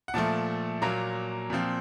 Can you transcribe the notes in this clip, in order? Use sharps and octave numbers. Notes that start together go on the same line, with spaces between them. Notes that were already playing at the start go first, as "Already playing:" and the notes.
F#5
A#2 F3 A3 A5
A#2 F#3 A#3 A#5
A#2 F3 C4